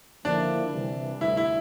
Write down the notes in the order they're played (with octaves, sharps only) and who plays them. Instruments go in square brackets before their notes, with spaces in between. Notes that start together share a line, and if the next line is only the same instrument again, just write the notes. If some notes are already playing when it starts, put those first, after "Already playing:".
[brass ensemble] D3 F3 A#3 E4 [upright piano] D4
[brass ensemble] C2 C3 E3 G3
[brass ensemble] D2 D3 G3 [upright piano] E4
[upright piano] E4